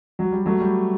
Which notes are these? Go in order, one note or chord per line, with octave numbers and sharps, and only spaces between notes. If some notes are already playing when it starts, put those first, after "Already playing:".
F#3
G3
F#3 A3
G3